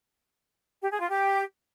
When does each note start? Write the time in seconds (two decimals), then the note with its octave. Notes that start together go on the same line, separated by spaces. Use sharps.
0.82 G4
0.91 G#4
1.00 F4
1.09 G4